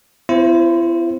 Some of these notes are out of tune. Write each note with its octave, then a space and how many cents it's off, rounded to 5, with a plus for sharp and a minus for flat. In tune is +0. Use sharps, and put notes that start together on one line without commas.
C4 -40 E4 +40 C5 +15